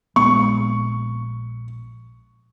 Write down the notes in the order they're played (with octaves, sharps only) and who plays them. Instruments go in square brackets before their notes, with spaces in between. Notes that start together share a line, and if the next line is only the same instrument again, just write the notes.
[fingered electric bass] A#1 G#3 B3 [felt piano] C#6